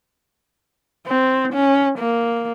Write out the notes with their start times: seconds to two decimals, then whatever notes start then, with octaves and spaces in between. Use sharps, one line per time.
1.07 C4
1.53 C#4
1.99 A#3